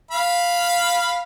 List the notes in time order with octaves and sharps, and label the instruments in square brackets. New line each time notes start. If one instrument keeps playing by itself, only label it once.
[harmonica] F5 B5